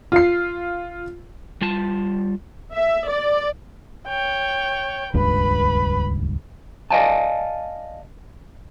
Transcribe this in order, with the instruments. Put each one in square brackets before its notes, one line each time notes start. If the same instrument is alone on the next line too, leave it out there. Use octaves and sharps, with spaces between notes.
[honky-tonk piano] F4 C7
[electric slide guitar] G3 F4 A5
[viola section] E5
D5
[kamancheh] C#5 G5
[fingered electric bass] D#1 C#2 G2 [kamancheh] B4 B5
[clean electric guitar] D5 D#5 F5 G#5 A5